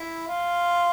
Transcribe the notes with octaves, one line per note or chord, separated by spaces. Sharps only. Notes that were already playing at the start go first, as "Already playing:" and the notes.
Already playing: E4
F4